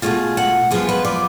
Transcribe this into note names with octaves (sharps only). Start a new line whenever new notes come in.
B2 A3 F4 G#4
F#5
F#2 F3 B3 F4 G#4
B4
D5